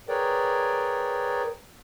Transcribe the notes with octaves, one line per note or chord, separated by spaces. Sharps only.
G#4 A#4 B4 C#5 D5 G5